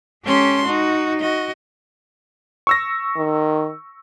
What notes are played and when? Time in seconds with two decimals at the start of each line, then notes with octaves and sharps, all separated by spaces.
0.24 G#3 C#4 G4 A4 C6
0.65 D#4 F#4
1.20 F#4 D#5
2.67 C#6 E6 A#6
3.16 D#3